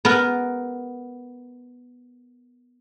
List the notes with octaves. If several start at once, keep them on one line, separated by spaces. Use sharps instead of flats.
B3 A#4